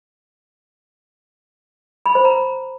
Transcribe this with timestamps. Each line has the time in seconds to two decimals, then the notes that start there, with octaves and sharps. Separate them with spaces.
2.06 B5
2.15 C5
2.25 A#5